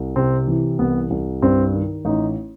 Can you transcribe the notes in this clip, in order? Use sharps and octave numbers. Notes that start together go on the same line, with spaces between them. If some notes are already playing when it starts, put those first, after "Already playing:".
Already playing: C2
C3 C4
E3
C2 B3
C2
G2 C4
D#3
A1 D#4